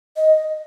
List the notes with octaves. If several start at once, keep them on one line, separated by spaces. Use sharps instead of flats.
D#5